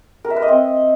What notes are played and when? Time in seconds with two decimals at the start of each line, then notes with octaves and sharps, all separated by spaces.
0.24 A#4
0.30 E5
0.36 B4
0.42 D#5
0.48 C4